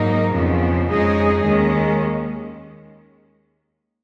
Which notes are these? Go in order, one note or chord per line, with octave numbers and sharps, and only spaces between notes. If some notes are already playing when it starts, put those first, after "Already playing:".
Already playing: G#2 F#3 A#3 D#4 A#4
F2 C#3 F3 B3
F2 C#3 G#3 D#4 G#4
D#2 D#3 G#3 C#4